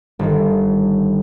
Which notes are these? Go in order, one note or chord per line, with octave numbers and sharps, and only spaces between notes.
G1 D#3